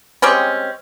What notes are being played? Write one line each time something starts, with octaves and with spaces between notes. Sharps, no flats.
G3 G#3 C4 C#4